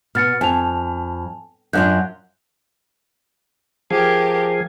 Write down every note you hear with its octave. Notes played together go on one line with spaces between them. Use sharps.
B2 F6 A6 C#7
F2 G#5 A5 F7
F#2 D4 F4 F5 F#6 G6
F3 G4 G#4 A#4